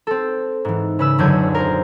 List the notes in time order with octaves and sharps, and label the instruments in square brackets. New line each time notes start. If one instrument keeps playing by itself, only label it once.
[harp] C4 A4
G#2 E3
C#3 B4 E6
D#1 F#2 D3 F#3 G6 G#6
A#4 C5